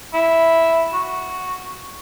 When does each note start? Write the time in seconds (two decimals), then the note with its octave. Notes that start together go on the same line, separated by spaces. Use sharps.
0.14 E4
0.94 F#4